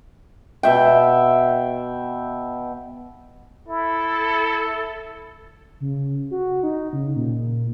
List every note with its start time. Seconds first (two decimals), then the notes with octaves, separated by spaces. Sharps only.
0.63 B2 E5 G5
3.68 E4 A4
5.81 C#3
6.31 F#4
6.63 D#4
6.93 C#3
7.16 A#2